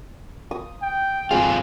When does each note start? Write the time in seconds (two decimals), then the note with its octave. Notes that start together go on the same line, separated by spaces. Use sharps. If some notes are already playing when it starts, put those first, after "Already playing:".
0.51 D#6
0.83 G5
1.31 G2 C4 F4 G#4